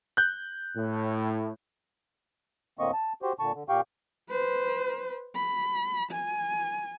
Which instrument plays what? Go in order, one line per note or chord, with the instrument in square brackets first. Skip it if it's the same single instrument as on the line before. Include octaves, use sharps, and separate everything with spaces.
[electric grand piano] F#6 G6
[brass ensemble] A2
[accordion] A2 D3 A#3 C4 D#5 C#6
A5
F#4 G4 C5
A#2 D3 A5 C#6
D3
A#2 G4 F5 G5 C#6
[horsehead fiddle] B4 C5
B5
G#5